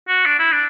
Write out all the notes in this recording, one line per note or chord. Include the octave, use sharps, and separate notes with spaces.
F#4
D4
E4
D4